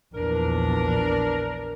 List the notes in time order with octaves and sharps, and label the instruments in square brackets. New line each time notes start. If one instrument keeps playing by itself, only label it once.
[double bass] A#1 E2 [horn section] D4 A#4